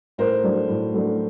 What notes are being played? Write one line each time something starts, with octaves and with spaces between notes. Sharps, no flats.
A2 A#4 C5
F#3 A3 D4
A2
F#3 A3 D4